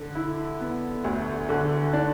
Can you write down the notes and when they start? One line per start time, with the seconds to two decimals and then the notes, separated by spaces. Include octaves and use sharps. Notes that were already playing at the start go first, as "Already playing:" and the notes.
Already playing: D3
0.15 E4
0.60 B3
1.04 D2
1.49 D3
1.93 D4